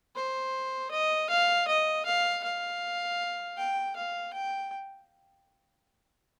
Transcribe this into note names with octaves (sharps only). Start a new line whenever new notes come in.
C5
D#5
F5
D#5
F5
F5
G5
F5
G5